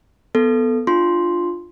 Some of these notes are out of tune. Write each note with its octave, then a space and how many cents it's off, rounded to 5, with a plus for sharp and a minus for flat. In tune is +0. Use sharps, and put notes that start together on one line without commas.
B3 +5 A4 +0
D4 +30 F4 +0 C6 +0